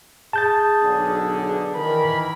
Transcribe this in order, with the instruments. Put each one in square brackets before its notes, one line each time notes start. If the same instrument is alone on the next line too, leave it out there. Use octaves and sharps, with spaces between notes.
[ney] G#4 [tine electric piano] A5 G6 A6
[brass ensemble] B1 D3
[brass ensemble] D#3 E3 A#4 [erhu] B5